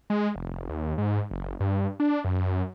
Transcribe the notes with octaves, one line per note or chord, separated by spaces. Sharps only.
G#3
F1
D#2
G#2
F#1
G2
D4
F#2